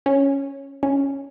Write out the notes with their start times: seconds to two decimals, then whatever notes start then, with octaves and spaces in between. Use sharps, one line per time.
0.06 C#4
0.83 C#4